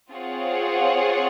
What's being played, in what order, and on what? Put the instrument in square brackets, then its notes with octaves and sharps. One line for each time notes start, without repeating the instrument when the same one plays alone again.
[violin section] C4 F4 G#4 C#5 F#5